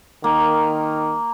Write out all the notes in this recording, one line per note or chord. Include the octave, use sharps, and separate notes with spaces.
D#3 A#3